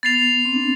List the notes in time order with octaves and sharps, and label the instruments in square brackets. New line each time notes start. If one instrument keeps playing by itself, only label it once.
[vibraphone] B3 [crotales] A6 C7 F7
[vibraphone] C4
D4